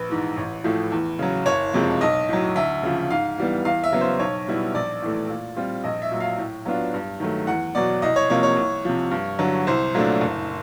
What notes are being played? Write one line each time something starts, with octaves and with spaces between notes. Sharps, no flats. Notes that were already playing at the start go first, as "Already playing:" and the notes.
Already playing: A#1 B4
G#2 E3
A1
A2 F3 A3
E2
C#3 F#3
F#1 C#5
F2 C3 F3 G#3
B1 D#5
A2 F#3
D2 E5
C#3 F3
G#2 F5
E3 G3 B3
E2 F5
E5
C#3 F#3 B3
C5
B1 C#5
B2 G3 B3 E4
A#1 D5
A2 E3 A3
A#2
G3 C4 F4
A#1 D#5
E5
A#2 F#3
F5
A2
F#3 B3 D4 F4
G2
D#3 F#3 A3
E2 F#5
B2 F#3 D5
C2 D#5
C#5
C3 F3 A#3 C#5
C#5
C2
C3 F3
G2
D3 F#3
C2 C5
A#2 F#3 A3 D4
F#1